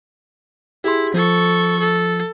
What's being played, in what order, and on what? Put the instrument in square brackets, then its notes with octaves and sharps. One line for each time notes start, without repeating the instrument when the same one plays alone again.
[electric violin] E4 [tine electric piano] G4 G#4 C6
[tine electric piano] F3 [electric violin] A4 C#6
[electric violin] A4